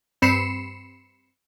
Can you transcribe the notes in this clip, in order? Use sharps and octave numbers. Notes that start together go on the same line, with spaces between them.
G2 C4 B5 C7 C#7 E7